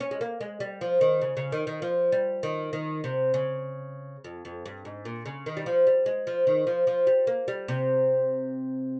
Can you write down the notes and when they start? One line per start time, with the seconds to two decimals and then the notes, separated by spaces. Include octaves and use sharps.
0.01 C#4
0.11 G#3
0.21 A#3
0.41 G#3
0.60 G3
0.81 F3
1.01 D#3
1.22 C#3
1.37 C#3
1.52 D#3
1.67 D#3
1.82 F3
2.12 G3
2.43 D#3
2.73 D#3
3.04 C3
3.34 C#3
4.24 F2
4.45 F2
4.66 G2
4.85 G#2
5.05 A#2
5.26 C#3
5.46 D#3
5.57 G3
5.66 F3
5.87 G3
6.06 G#3
6.27 F3
6.47 D#3
6.67 F3
6.87 F3
7.07 G3
7.27 A#3
7.48 G3
7.68 C3